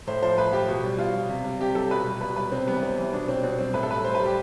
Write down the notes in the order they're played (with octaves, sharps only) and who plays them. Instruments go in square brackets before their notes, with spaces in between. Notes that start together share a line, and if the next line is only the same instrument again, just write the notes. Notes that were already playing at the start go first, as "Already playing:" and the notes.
[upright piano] A2 C5
F3 C5
A2 B4
F3 G4
B2
G3
B2 F4
G3
C3
G3
C3 G4
G3 A4
B2 B4
G3
B2 B4
G3 B4
C3 C4
E3 G3 B3
C3 C4
E3 G3
B2 D4
G3 C4
B2 C4
G3 C4
A2 B4
A4
G3 B4
A2 C5
G3 B4
G4